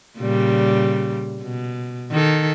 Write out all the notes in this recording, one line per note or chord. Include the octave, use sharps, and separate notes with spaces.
A#2 C#3 G3
B2
D#3 A4